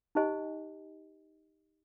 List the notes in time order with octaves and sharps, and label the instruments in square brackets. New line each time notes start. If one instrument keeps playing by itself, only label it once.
[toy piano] D#4 G4 C5 D#5 G#5